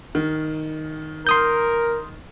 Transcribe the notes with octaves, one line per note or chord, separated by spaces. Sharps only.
D#3
A#4 C6 D#6 G6